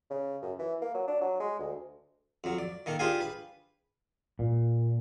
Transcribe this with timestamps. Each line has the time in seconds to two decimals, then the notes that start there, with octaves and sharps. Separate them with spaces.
0.10 C#3
0.42 F#2
0.59 E3
0.82 A#3
0.94 F#3
1.07 D4
1.21 F#3
1.40 G#3
1.59 D2
2.44 F2 F#3
2.58 D5
2.86 D#3 A#3 A4
2.99 D4 F4 G4 G#4 F5 G#5
3.21 B4
4.39 A#2